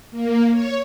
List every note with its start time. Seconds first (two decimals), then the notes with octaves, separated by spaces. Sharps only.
0.11 A#3
0.51 C#5